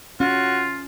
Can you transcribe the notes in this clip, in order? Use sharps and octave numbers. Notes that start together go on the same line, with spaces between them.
C#4 F4 F#4